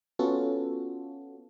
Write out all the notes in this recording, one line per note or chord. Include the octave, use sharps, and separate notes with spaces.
B3 C#4 F4 F#4 A4